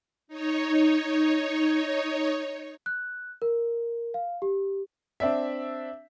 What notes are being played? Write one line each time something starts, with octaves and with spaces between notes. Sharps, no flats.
D#4 C#5
F#6
A#4
F5
G4
C4 D4 E5